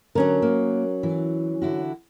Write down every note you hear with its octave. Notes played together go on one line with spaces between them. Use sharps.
D3 F#3 C#4 A#4
A#3
E3
D3 E4 F#4